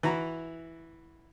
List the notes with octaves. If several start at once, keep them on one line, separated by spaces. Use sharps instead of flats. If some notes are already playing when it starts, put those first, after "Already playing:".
E3 E4 F#4 A#5